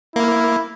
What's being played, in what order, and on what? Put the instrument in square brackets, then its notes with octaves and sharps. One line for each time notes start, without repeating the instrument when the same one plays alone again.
[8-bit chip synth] A#3 [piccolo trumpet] E4